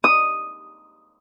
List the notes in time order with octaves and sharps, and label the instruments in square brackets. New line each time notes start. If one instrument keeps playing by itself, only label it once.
[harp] D#6